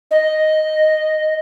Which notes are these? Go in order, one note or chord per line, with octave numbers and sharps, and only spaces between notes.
D#5